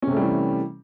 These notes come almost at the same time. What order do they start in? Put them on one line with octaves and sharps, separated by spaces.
C#4 C3 A3 G3 E3